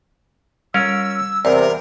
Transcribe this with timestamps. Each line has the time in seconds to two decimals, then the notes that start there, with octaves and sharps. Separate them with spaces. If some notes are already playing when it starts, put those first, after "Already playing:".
0.74 G3 C#4 F4 A#4 E6
1.45 E2 C3 A#4 D5